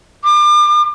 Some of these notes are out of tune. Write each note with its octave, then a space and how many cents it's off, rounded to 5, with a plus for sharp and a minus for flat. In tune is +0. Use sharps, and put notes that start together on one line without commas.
D6 +35